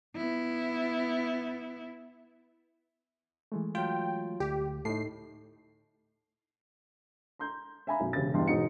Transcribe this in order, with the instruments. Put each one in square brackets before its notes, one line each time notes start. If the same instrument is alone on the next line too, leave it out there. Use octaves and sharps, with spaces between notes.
[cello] B3 E4
[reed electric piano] E3 G#3 A3
[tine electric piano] F#3 F4 [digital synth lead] G5
[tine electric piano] D2 [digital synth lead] G4
[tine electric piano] A2 [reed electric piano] D#4 A4 [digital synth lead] C7
[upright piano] A#5 C6 G6
E5 F5 G#5 A#5 B5
B1 F#2
E1 C#3 G4 A6
E2 G2 D#5 G5 C6
E1 G#2 G#3 D#4 F#4 C#7